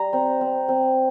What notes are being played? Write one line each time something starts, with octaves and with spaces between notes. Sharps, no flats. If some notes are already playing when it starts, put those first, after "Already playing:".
Already playing: G3 A#5
C4
C4
C4